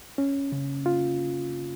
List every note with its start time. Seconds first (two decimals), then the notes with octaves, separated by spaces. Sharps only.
0.18 C#4
0.52 C#3
0.86 F4